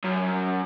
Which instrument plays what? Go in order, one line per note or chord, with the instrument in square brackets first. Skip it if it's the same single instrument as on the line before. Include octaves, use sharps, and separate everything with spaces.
[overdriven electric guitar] F#2